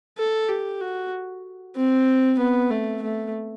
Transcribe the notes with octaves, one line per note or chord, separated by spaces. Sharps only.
A4
G4
F#4
C4
B3
A3
A3